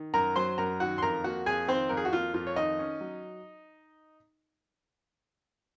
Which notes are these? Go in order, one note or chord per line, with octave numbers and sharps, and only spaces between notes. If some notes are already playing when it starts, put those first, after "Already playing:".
Already playing: D#3
F#2 A#4 A#5
F#3 C5 C6
F#2 A#4 A#5
D#3 F#4 F#5
C6
F2 A#4 A#5
A#3 F#4 F#5
F2 G#4 G#5
D#3 C4 C5
F2 A#4
G#4
F#4
A#3 F4
F2 F4
C#5
D#3 D#4 D#5
C#4
F#3